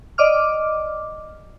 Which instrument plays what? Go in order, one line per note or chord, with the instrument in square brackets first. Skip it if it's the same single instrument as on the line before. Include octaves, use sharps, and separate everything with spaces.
[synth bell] D5 D#5 D6 F6